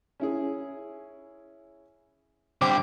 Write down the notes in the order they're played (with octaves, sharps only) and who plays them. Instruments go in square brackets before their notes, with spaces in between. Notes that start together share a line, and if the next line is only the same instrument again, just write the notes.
[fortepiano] C#4 E4 G#4
[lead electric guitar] D3 G3 [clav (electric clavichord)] C4 [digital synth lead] D6